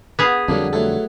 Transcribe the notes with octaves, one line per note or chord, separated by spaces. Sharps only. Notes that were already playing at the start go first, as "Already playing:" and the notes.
B3 G#4 F5
F2 D3 F#3 G3 A#3 D4
F#3 A3 A4